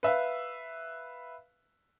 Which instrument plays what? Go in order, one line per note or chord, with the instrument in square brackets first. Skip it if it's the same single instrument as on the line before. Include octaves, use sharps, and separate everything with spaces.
[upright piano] B4 E5 F5